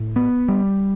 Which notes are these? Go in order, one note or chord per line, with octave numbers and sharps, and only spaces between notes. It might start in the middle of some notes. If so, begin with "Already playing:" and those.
Already playing: A2
B3
G3